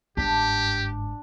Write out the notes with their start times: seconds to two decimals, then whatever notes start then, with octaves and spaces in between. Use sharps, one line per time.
0.17 G1 G#2 D4 G4